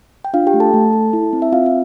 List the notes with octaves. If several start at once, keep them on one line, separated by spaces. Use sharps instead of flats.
G5
D4 F4 F5
G4 G5
A3
A4 A5
A3
A4
E4
C4
E5
C4 F4 F5
F5